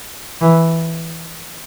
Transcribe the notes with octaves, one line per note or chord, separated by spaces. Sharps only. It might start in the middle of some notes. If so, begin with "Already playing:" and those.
E3